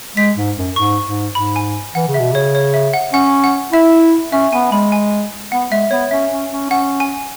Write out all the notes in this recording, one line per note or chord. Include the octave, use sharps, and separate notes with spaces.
G#3 B6
G#2
F#2
G#2 C#6
G#2
G#2 B5
G#5
E3 F#5
C#3
E5
B2
C#3 C#5
C#5
E5
F#5
C#4 F#5
F#5
E4 E5
C#4 E5
B3 G#5
G#3 B5
G#5
B3 F#5
G#3 E5
B3 C#5
C#4 E5
C#4
C#4
C#4 F#5
G#5